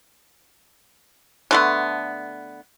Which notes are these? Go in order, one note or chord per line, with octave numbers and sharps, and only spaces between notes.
D3 A3 B3